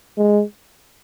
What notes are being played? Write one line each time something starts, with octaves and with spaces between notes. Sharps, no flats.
G#3